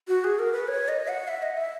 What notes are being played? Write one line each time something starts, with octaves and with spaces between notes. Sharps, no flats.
F#4
G#4
A#4
B4
C#5
D#5
F#5
E5
D#5
E5